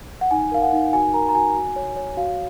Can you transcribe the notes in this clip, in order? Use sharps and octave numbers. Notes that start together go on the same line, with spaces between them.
F#5
D#4 G#5
A#4 F5
F#5
D#4
F#4 G#5
A#4 A#5
A#5
F#4 G#5
F#4
C#5
C#5
F#4 F5